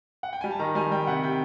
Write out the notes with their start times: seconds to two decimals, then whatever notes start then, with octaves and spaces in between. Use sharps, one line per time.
0.23 F#5
0.33 G5
0.41 G3 G#5
0.51 A5
0.59 D#3 A#5
0.75 G3 G#5
0.91 G3 G5
1.07 C3 F#5
1.23 C3 G5